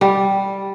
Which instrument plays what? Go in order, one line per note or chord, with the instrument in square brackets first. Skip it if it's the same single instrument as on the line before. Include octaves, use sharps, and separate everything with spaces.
[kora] G3